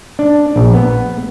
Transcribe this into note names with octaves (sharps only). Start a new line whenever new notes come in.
D4
A#1
B3